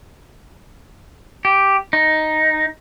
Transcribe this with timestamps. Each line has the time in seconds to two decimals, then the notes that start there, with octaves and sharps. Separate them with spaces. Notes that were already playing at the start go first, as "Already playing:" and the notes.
1.45 G4
1.93 D#4